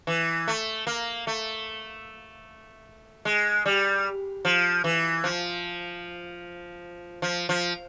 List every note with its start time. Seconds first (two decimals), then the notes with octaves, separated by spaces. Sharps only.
0.07 E3
0.48 A3
0.87 A#3
1.27 A3
3.25 G#3
3.66 G3
4.45 F3
4.84 E3
5.24 F3
7.22 F3
7.49 F3